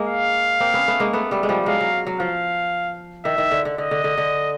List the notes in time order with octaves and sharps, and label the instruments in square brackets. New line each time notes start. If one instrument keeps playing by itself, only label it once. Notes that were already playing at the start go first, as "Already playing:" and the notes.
Already playing: [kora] G#3 A#3
[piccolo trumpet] F5
[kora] A#3 C4
B3 C#4
A3 B3
G#3 A#3
A3 B3
G3 A3
G#3
F3 G3
[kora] F#3 G#3 [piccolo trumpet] F5
[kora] F#3
F#3
[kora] F3 [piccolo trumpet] F5
[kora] D#3 [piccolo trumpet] E5
[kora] D#3
D3
D3
[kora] D3 [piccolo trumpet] D#5
[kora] D3
D3
D3